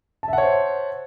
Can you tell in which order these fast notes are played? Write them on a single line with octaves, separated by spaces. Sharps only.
A5 E5 F#5 C#5 C5